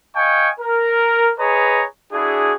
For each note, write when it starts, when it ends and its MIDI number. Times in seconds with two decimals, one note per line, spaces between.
0.15 0.49 75
0.15 0.49 77
0.15 0.49 79
0.15 0.49 80
0.15 0.49 85
0.60 1.31 70
1.39 1.84 68
1.39 1.84 71
1.39 1.84 73
1.39 1.84 75
1.39 1.84 82
2.13 2.54 62
2.13 2.54 64
2.13 2.54 66
2.13 2.54 68